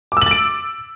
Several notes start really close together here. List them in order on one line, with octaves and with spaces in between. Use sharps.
D6 E6 F#7 A6 D7